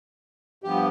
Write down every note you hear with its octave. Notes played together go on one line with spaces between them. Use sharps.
G2 F3 B3 G4